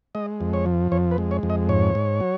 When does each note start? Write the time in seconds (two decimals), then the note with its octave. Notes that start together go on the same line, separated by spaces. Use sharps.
0.15 G#3 D#5
0.41 F2
0.53 C#5
0.66 F3
0.92 F2 C#5
1.11 B4
1.18 G#3
1.31 C#5
1.43 F2
1.50 D#5
1.69 G#2 C#5
1.95 G#2
2.20 F#3